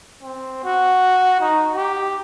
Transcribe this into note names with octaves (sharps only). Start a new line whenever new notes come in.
C4
F#4
D#4
G4